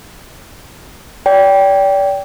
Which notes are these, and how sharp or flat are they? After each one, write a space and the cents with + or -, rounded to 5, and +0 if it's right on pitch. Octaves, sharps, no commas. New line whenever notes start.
D5 -35 G5 +0